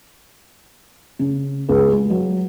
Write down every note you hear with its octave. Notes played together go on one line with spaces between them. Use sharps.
C#3
C#2
G#3
F#3